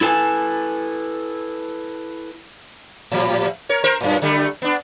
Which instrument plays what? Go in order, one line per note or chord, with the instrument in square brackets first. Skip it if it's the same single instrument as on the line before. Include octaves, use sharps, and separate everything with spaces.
[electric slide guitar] E4 A4 B4 G#5
[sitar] A2 F3 G3
A#4 C#5
A#4 C5
F#2 A#2
D3 G3 A3
B3 D4